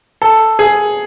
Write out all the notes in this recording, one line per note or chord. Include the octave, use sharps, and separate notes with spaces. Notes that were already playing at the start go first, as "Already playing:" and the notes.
A4
G#4